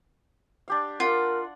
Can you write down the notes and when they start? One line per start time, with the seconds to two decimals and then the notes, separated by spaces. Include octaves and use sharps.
0.68 D4 G4 F5
1.00 F4 A#4 F#5